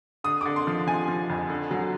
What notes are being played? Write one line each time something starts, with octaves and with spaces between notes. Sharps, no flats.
D3 D#6
D3 D6
C6
F3
F3 G#5
F3
F2
D3
F#3